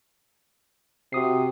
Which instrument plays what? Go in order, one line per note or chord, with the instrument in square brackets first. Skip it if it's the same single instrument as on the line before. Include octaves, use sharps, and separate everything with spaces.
[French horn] C3 [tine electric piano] F#4 D#6 C7